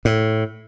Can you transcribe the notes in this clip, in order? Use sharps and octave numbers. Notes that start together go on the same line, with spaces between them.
A2